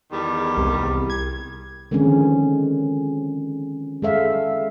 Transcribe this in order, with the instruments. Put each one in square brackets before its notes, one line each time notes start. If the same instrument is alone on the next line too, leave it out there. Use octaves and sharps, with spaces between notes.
[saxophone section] E2 D#3 G3
[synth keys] C2
G#6
[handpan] D3 D#3 F3 G#3 C4 C#4
G#3 A4 E5 F5